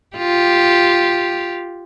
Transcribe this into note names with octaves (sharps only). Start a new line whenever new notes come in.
F4 G4